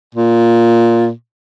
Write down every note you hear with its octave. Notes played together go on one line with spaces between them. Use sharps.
A#2